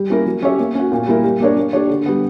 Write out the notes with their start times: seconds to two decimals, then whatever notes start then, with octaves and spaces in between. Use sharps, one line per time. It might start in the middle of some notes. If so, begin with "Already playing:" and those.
Already playing: G3
0.10 A#3 C#4 E4 A#4
0.26 F#3
0.42 C#4 G4 C#5 E5
0.58 A#3
0.75 C#4 F#4
0.92 A#2
1.07 G3 A#3 E4 A#4
1.24 G3
1.40 A#3 D4 A#4 C#5
1.57 A#3
1.73 D4 G4 C#5
1.89 D3
2.06 G3 B3